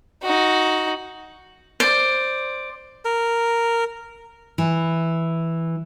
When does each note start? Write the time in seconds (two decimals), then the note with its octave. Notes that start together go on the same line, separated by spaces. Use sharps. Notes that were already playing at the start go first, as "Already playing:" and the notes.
0.23 D#4 F#4
1.80 C5 D5
3.05 A#4
4.58 E3